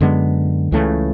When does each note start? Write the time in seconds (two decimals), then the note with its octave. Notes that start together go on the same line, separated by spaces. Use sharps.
0.01 F#2 D3 G#3 B3
0.72 C#2 C#3 E3 A3